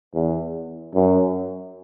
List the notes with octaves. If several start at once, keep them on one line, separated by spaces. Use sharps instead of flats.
E2
F#2